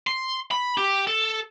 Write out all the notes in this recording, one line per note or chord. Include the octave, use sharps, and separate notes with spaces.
C6
B5
G4
A4